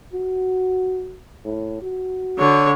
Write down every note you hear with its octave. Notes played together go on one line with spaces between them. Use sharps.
F#4
A2
F#4
D3 C#5